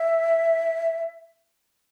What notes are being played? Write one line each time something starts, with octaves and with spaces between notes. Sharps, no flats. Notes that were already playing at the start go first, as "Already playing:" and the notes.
Already playing: E5